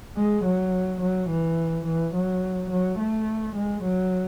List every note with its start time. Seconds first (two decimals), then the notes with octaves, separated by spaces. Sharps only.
0.17 G#3
0.45 F#3
1.01 F#3
1.30 E3
1.86 E3
2.14 F#3
2.71 F#3
2.99 A3
3.56 G#3
3.84 F#3